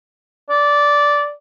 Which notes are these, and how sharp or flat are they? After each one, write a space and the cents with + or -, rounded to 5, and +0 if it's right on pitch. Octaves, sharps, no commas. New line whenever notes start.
D5 -10